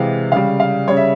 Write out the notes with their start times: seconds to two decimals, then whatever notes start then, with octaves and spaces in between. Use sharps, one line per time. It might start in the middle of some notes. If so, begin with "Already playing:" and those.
Already playing: C3 E3 G#3 F5
0.32 C#3 G3 F5
0.60 F5
0.88 C#3 G3 C#5
0.97 E5